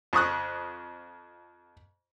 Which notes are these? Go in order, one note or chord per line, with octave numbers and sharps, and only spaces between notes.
F2 C#6 D#6 F#6